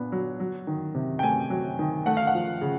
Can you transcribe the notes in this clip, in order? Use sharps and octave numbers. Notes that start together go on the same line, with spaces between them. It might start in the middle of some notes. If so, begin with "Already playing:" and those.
Already playing: A#2 B3 D4
F#3
F#3
D#3
C3
G5
A3 G#5
F#3
D#3
A3 F#5
F5
F#5
F3
C#3